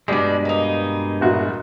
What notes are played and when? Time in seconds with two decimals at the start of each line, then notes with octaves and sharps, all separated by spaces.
0.08 G2 B2 G3 G#3 D4
0.45 A#3 D#4
1.21 A#1 E2 F#4